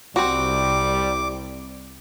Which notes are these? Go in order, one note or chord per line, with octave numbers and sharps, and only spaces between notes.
C2 G3 C4 F#4 D6